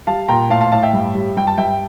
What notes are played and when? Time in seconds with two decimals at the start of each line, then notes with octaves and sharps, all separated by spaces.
0.07 G3 F5 A5
0.28 A#2 G5 A#5
0.50 A2 F5 A5
0.61 F5 A5
0.72 A2 F5 A5
0.82 E5 G5
0.93 G2
1.15 G3
1.37 G2 G5
1.47 A5
1.58 G2 E5 G5